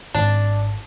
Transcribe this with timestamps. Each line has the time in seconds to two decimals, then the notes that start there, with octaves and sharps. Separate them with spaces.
0.15 G#1 D4 A5